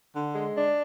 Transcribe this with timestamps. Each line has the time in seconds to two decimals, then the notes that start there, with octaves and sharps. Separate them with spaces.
0.14 D3
0.34 G#3
0.54 D4